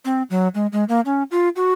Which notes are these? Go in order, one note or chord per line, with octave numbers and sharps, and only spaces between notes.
C4
F#3
G#3
G#3
A#3
C#4
F4
F#4